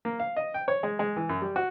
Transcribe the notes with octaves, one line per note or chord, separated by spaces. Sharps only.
A#3
F5
D#5
G5
C#5
G#3
G#3
E3
F#2
G3
F#4